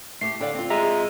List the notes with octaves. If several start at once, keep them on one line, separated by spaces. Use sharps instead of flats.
A3 G4 C7
D3 D5 F5 G5
C4 F4
G#3 E5 A#5